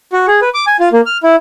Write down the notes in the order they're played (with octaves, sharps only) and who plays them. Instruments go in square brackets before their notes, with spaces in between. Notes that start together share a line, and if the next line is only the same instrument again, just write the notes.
[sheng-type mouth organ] F#4
G#4
B4
D6
G#5
F4
A#3
F6
E4